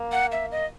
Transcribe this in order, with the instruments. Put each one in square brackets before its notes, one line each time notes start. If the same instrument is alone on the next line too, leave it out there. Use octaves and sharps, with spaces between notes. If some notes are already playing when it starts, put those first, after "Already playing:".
Already playing: [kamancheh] A#3
[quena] F#5
E5
D#5